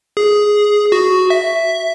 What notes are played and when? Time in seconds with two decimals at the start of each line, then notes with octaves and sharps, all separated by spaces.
0.17 G#4
0.92 F#4
1.30 E5